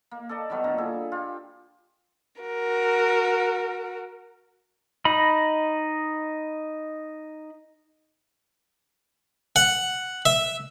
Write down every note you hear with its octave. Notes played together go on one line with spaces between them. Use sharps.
A#3
A4 D5 D#5 A5
D#3 F#3 G3 B3
A#2 D3 A#5
E4 G#4 A4
F4 G4
F#4 A#4
D#4 D#5 B5
F#5
E5